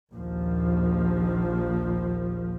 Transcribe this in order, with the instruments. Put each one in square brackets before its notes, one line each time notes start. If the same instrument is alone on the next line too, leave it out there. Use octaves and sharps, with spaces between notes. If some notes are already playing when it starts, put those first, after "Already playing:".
[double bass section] A#1 D#2 F3